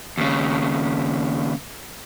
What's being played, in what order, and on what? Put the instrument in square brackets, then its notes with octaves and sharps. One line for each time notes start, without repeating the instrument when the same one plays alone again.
[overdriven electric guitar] D#2 C#3